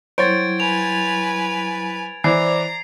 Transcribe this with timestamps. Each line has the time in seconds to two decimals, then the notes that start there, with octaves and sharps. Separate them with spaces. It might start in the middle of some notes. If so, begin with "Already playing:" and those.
0.18 F#3 G3 E4 C5 C#5 G#6 A6 D7
0.60 B4 G#5 F7
2.24 E3 C5 D5 A#5 D6 C7